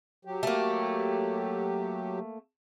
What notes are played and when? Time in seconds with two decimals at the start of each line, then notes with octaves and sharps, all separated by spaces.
0.25 F#3 G4
0.43 A3 A#3